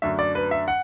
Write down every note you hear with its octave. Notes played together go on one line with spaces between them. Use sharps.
F#2 D3 A3 D4 E5
D5
B4
E5
F#5